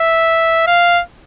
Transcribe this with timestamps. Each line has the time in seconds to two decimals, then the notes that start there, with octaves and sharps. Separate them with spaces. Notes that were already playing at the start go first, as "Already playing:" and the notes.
Already playing: E5
0.67 F5